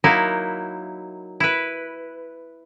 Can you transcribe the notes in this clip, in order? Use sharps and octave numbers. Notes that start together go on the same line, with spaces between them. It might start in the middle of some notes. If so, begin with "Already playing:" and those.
F#3 A#3 D#4 E4
E4 B4